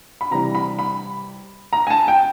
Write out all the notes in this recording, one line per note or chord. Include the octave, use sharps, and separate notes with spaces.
B5
C3 E3 G3 A#5
B5
B5
A#5
G#5
A5
G5